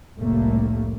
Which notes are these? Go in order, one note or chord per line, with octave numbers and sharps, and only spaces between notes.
F1 C2 A2 A3 A#3